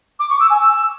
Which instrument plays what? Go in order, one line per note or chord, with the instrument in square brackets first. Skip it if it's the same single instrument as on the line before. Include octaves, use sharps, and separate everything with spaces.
[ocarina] D6
C#6
E6
G#5
E6